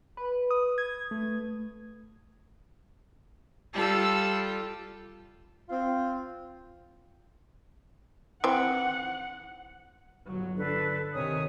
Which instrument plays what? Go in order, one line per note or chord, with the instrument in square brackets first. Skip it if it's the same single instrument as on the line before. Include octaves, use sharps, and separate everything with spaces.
[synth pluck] B4
D#6
G#6
A3
[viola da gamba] G3 F4 [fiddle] A4 E6
[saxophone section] C4 F4
[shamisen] E3 C4 [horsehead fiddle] F#5
[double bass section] G1 F#3
[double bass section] D3 [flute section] D4 A4 B4
[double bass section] C3 D#3 [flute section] C#5 G#5 D#6